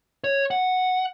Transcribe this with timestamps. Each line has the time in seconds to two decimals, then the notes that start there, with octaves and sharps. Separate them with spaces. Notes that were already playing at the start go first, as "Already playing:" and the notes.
0.24 C#5
0.51 F#5